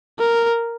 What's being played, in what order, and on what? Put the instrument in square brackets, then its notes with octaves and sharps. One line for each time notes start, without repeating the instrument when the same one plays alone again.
[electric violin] A#4